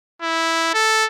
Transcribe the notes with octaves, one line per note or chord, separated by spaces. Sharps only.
E4
A4